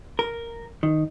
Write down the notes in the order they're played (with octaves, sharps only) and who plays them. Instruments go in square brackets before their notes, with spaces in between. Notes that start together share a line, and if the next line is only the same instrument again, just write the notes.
[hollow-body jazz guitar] A#4
D#3